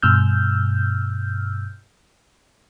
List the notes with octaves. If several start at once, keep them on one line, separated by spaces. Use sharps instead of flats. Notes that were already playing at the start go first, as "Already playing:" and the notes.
G2 B2 E6 F6 G6